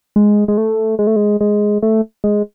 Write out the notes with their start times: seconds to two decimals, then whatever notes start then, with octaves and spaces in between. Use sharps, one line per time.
0.16 G#3
0.48 G#3
0.58 A3
0.99 G#3
1.07 A3
1.16 G#3
1.41 G#3
1.82 A3
2.24 G#3